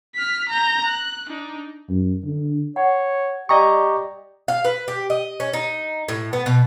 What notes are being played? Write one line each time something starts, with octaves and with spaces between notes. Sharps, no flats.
F6 B6
A#5 G6
F#6
D4 D#4
F#2
D3
C#5 F#5
G4 D5 D#5 G5 A#5 C#6 D#6
F5
B4
G4
D#5
C#4
D#4
A2
B3
B2